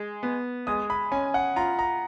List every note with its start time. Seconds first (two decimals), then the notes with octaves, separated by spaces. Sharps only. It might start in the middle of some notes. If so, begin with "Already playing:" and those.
Already playing: G#3
0.23 B3
0.67 G#3 D#6
0.90 B5
1.12 C#4 G#5
1.34 F#5
1.56 F4 A#5
1.79 A#5